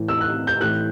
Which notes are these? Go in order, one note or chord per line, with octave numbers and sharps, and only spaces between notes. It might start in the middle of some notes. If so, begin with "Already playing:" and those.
Already playing: A2 E3
E6
F#6
G6
A2 E3 F#6